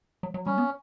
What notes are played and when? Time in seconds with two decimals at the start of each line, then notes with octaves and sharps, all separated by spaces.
0.23 F#3
0.34 F#3
0.46 G3 C#4
0.58 B3